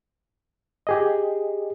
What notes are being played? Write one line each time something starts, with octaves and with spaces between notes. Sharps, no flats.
G4 G#4 D#5